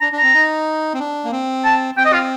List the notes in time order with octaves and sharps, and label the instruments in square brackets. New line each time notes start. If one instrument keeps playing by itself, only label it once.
[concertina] D4 [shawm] A#5
[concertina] D4
[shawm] A#5
[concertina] C4
D#4
C4
D4
A#3
C4
[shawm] A5
[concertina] C4 [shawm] G5
[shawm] D#5
F4